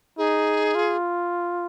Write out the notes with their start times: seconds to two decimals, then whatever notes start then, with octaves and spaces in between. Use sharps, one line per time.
0.18 D#4 G#4
0.75 F4